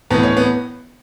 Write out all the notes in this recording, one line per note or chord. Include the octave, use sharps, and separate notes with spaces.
A2 E3 B3
C#4
B3